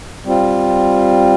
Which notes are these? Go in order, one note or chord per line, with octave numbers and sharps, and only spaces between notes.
G3 C4 F4